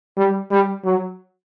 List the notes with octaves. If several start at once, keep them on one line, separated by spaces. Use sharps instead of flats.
G3
G3
F#3